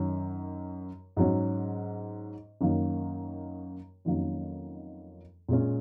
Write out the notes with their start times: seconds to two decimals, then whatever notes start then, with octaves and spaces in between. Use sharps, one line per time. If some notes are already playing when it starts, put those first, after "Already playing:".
Already playing: F#2 D#3 F#3
1.17 G#2 F#3 C#4
2.61 F#2 D#3 F#3 A#3
4.05 F2 D#3 F#3 A#3 C#4
5.49 A#2 G#3 C#4